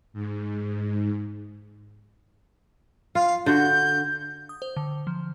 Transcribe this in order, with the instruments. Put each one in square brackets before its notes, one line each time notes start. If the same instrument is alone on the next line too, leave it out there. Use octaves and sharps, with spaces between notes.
[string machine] G#2
[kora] F4 [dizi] F5
[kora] D3 F#4 [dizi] G6
[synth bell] D#6
C5
D3
F3